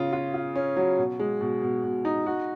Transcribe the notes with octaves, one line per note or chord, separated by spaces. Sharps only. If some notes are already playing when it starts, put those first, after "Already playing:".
Already playing: C#3 F4
F4
F4
C#4
F#3
B2
G#3
B2
B2
B2
D#4
F#4